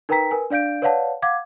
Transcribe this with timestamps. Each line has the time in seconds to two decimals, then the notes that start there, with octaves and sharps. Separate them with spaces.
0.09 D#4 A#4 B4 G5 A#5 B6
0.31 A#4 B4 G#5
0.50 D4 D5 F5 G6 D7
0.82 B4 C#5 D5 F5 F#5 A5
1.22 F5 F#5 D6 G#6